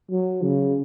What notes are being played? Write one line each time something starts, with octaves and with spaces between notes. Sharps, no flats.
F#3
C#3